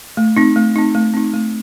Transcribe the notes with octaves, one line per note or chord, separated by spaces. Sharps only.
A3
C4 D#4
A3
C4 D#4
A3
C4 D#4
A3